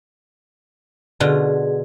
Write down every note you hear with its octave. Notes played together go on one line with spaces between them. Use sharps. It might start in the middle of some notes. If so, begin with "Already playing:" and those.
B2 D3 F4 G#4